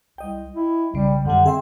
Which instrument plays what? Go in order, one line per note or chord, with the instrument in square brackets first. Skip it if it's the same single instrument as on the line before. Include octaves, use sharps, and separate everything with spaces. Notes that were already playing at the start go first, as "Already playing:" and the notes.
[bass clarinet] C2 [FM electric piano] D#5 G5
[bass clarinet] E4
[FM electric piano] B1 C#3 [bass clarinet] G3
[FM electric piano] F#2 G3 [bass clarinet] D3
[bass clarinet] C4 [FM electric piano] G#4 E5 C6